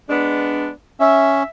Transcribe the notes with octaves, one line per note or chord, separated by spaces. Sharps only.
G#3 B3 D4
C#4 E5